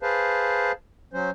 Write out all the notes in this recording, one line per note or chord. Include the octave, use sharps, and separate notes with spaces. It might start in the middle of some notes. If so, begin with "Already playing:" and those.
G#4 B4 C5 F5 A5
F#3 C#4 C5